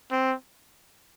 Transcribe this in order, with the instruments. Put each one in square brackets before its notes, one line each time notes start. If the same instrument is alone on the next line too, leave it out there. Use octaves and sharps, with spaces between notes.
[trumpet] C4